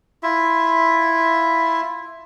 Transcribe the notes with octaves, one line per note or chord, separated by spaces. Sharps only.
E4 F4 E5